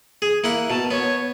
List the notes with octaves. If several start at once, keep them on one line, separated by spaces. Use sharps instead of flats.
G#4
A#3 E4 F#5
B2 A5
B3 C#5